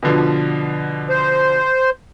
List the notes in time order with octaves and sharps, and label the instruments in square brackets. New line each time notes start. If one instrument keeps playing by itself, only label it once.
[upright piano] B2 D3 F3
[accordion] C5